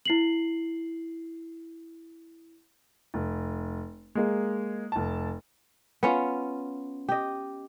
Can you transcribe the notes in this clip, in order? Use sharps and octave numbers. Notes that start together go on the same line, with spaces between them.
E4 C7 F#7
F1
G#3 A#3 G#4
F1 A5
B3 C#4 F4
G4 D#5